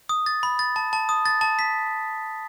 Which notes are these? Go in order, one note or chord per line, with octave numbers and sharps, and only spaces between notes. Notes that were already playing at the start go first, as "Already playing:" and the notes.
D#6
A6
B5
A6
A5
A5
D#6
A6
A5
B6